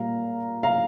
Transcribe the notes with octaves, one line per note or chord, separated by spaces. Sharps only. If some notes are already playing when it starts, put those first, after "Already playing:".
Already playing: A#2 G3 A#3 F5 A#5
F5 A#5